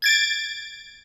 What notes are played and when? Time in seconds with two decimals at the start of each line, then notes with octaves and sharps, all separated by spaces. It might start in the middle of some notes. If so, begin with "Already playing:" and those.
0.02 G#6 A6 D7